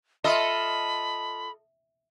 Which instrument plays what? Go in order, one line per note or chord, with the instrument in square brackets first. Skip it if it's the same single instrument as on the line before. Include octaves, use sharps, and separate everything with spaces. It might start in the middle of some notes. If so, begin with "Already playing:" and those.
[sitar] F4 A4 D#5 [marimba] E5 [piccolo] B5